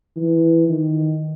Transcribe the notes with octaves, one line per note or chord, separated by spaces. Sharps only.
E3
D#3